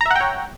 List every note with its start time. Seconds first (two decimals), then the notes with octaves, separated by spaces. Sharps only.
0.01 A#5
0.06 E5
0.11 F#5
0.16 G5
0.21 C#5